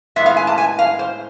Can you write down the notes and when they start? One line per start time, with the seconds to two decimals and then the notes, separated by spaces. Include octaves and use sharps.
0.16 A2 G#3 B3 E5
0.26 F5
0.37 G#5
0.47 A5
0.58 G#5
0.79 F5
0.99 C5